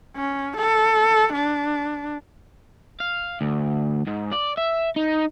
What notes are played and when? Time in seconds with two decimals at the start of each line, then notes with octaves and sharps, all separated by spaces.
0.16 C#4
0.57 A4
1.33 D4
3.00 F5
3.41 D2
4.07 G#2
4.32 D5
4.57 E5
4.96 D#4